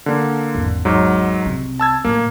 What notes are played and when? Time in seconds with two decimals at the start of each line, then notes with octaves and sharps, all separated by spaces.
0.06 D3 A#3
0.55 G#1 E2
0.85 G#2 F#3
1.45 C2 C4
1.80 A5 E6 G#6
2.05 A2 D#3 A#3